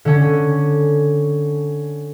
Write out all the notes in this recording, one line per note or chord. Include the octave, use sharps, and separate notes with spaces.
D3 C#4